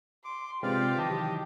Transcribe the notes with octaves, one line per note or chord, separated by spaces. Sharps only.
C6 D6
C3 G#3 C4 F4 G4 B4 D5 F5
D#3 E3 F#3 D#5 A5